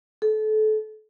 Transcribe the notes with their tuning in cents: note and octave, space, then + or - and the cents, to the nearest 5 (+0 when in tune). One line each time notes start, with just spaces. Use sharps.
A4 -30